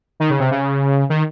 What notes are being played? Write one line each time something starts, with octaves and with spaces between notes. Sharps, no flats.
D#3
C#3
C3
C#3
D#3